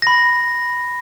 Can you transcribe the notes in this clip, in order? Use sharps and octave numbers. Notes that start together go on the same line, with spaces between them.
B5 A#6